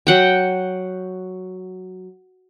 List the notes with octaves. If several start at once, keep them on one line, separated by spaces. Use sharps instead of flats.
F#3 F#5 G5